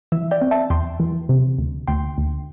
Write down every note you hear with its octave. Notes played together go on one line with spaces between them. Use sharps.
E3 E5
D5 G5
C4
E5 A5
E2 G5 C6
E3
C3
D2
D2 G5 C6
D2